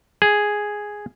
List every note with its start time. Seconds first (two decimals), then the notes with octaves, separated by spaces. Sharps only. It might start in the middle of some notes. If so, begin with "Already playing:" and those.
0.22 G#4